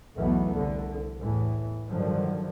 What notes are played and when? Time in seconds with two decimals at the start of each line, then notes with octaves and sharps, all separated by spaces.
0.17 B1 E2 E3 A3 B3
0.55 C2 D3
1.19 E2 A2 E3
1.89 G2 D3 D#3 F3 F#3